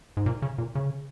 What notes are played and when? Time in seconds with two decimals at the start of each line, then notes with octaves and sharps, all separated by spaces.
0.17 G#2
0.26 A#2
0.42 C#3
0.58 A#2
0.75 C#3